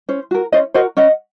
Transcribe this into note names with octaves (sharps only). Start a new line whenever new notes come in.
C#4 C5
F#4 A#4
C#4 C5 D#5
F#4 A#4 C5 D#5
C#4 D#5 F#5